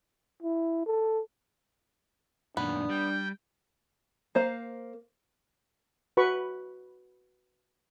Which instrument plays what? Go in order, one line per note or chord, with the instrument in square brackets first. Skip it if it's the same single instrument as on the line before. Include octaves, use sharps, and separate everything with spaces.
[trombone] E4
A4
[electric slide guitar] F#2 A#2 D#3 [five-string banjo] B3 [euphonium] D4
[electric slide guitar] G3 [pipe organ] G5
[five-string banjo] A#3 C5 F5
[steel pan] F#4 B4 B5 C#6